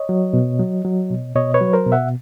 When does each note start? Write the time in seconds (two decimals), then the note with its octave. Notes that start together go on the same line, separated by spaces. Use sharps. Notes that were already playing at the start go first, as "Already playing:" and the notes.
Already playing: C#5 D#5
0.09 F#3
0.34 B2
0.59 F#3
0.85 F#3
1.10 B2
1.36 B2 C#5 D#5
1.54 B4 C#5
1.61 F#3
1.73 A#4 C5
1.86 B2
1.92 E5 F#5